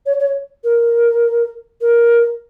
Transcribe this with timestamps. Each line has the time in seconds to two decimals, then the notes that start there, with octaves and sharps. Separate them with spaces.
0.06 C#5
0.19 C#5
0.64 A#4
1.81 A#4